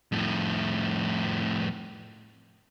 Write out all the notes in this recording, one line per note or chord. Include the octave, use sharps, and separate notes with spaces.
F2 A2